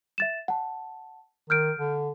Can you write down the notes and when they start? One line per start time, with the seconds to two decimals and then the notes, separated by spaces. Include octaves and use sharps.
0.18 E5 A6 E7
0.48 F#5 A5
1.50 D#3 F6 G6 D7
1.79 D3